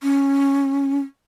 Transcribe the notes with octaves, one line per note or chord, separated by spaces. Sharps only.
C#4